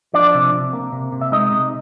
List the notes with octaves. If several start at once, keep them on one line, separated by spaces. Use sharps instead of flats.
F3 D4 D5
C3
C3
A#3
C3
C3
E5
G#3 D#4 D#5
C3